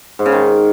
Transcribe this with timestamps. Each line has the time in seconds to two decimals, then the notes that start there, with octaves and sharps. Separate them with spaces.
0.19 G#2
0.26 C#3
0.32 D#3